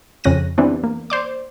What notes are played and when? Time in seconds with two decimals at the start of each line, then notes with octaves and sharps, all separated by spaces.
0.24 F2 C#3 C#4 F#6 A#6 D#7
0.58 E3 G3 B3 C4 D4
0.84 A#3
1.10 C5 D5 D6